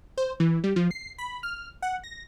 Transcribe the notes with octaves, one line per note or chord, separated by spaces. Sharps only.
C5
E3
G3
F3
C7
B5
F6
F#5
A#6